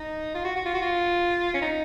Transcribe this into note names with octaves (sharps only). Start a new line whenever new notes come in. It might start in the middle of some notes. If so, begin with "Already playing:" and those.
Already playing: D#4
F4
F#4
F#4
F4
F#4
F4
C#4
D#4